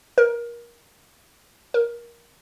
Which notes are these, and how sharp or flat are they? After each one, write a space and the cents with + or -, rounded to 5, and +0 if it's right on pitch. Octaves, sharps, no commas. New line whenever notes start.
A#4 +25
A#4 +20